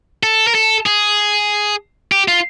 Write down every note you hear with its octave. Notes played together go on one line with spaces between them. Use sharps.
A4
A#4
A4
G#4
G4
F4